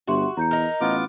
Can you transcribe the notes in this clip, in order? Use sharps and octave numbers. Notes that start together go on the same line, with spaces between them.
G1 F#4 G4 E5 C6
E2 A#5 G6 C#7
D#4 A#4
A1 B3 F4 D6